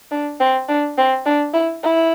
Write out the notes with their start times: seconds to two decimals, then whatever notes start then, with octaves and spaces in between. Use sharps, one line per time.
0.11 D4
0.40 C4
0.69 D4
0.97 C4
1.26 D4
1.54 E4
1.83 E4